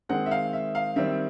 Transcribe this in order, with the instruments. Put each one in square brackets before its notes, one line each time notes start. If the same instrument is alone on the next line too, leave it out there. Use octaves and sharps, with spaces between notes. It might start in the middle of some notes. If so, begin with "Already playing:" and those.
[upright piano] D#3 G#3 C4 F#5
E5
F5
E5
F5
D#3 G3 C4 E5